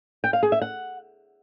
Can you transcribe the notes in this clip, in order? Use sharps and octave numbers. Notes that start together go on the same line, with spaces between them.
G5
F5
G#4
E5
F#5